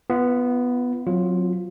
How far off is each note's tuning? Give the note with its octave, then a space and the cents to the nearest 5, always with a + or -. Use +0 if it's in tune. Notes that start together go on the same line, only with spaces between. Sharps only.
B3 +0 F4 -35
F#3 -20 C4 +0 F4 +0